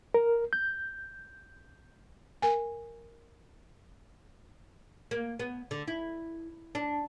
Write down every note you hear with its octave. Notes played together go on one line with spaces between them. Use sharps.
A#4
G6
A#4 G#5
A#3
B3
D3
E4
D4